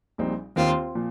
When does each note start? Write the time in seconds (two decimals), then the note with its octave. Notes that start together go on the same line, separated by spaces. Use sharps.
0.18 A#1 A#2 G3 C4 D#4
0.56 D#2 D#3 A#3 C4 F4
0.95 A#2 F3